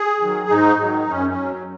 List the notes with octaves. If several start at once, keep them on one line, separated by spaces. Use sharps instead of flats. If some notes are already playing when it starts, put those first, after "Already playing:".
Already playing: G#4
D#3 F#3
G#2 D#4
D#3 F#3
F#2 C#4
C#4
F#3